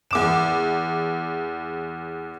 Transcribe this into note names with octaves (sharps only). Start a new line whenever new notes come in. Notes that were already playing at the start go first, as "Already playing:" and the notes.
E2 D6 E7